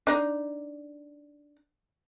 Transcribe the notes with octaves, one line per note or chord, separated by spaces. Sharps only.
D4 D#4